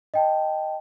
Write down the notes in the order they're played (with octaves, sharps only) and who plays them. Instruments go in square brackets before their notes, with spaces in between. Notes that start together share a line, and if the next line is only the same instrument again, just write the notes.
[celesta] D#5 G5 A5